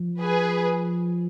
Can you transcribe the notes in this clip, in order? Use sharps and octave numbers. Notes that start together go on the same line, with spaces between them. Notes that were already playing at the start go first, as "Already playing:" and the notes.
Already playing: F3
G#4 B4